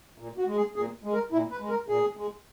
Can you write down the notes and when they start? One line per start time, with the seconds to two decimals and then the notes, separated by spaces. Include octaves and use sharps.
0.18 A#2
0.38 F#4
0.47 G#3
0.57 G#4
0.76 A#2 G#4
1.04 G#3
1.13 A#4
1.32 A#2 E4
1.51 B4
1.60 G#3
1.69 A#4
1.89 A#2 G#4
2.17 G#3